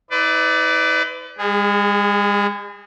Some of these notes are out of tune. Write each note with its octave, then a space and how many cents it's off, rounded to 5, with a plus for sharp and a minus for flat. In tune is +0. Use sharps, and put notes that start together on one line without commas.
E4 -45 B4 +35 D5 +0
G#3 -45 G#4 +0